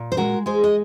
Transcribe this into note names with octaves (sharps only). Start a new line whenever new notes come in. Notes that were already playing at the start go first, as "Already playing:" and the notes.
Already playing: A#2
C5
G#3 F#4 A#4
G#3 G#4 C5
D#5